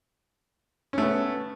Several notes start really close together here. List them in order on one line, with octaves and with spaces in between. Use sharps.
C#4 A3 B3